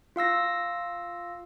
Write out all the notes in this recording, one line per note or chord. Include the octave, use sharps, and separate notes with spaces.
F4 F5 E6 A#6